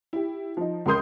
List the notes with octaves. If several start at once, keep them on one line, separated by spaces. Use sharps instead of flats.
E4 G4
F3 D#4
C#2 C#3 A#4 C6 D#6 G6